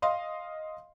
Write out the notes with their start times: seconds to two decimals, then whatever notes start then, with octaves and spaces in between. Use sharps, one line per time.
0.02 D#5 F5 C6 D#6